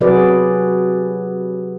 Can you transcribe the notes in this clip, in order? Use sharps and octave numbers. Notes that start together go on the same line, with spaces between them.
C3 F#3 F#4 G#4 B4 D5